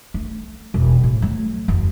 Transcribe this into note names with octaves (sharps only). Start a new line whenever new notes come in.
A3
E1
A2
F#3 A3
F#1 E2